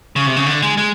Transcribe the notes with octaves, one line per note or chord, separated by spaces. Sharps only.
C#3
C3
C#3
D3
G#3
G#3